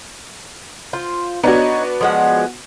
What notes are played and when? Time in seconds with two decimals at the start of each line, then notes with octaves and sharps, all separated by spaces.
0.93 F4 C5
1.43 B3 D4 D#4 F#4 C#5
2.01 F3 G#3 F#5